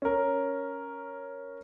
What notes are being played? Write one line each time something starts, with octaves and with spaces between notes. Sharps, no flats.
C#4 A#4